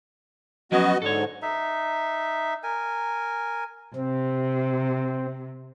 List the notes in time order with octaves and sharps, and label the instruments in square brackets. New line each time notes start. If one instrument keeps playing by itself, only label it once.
[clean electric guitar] F3 F#3 C#4 [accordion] B3 F#4 D#5
[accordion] G#2 D3 [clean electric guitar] A4 C#5
[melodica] D#4 E5
A#4 G#5
[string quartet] C3 [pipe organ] C4